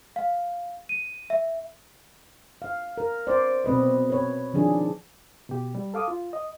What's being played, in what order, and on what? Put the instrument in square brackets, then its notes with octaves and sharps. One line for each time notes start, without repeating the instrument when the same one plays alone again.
[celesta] F5
D#7
E5
[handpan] F5
A#4
C5 D5
B2 C4 B4 D#5
B4 C#5
D#3 F3 D4 G#4
[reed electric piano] B2 G4
G3
A4 F5 D6 D#6
F4
D#5